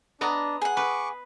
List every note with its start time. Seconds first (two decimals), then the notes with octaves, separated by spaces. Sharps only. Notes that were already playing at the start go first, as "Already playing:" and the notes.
0.21 B3 D4 D#5 A#5
0.62 G#4 F#5
0.77 B4 C#6 D6